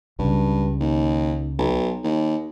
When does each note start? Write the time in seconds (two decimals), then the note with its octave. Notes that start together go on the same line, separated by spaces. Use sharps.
0.19 C#2 G2 C#3
0.80 D#2
1.58 B1
2.04 D#2